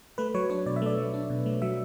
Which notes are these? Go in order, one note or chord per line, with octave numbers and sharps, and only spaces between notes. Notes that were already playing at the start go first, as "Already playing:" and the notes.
A3 B4
F#3 C#5
D4 C#5
B2 D5
E5
A3 D5
F#3
D4
B2
A3
F#3 E5